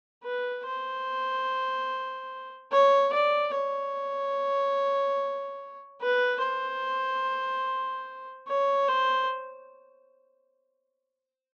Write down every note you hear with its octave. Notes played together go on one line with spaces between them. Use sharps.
B4
C5
C#5
D5
C#5
B4
C5
C#5
C5